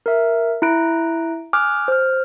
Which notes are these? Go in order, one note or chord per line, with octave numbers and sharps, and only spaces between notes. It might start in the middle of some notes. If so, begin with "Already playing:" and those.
A#4 E5
E4 A#5 F#6 D7
G#5 D6 D#6 F6 F#6
C5 F6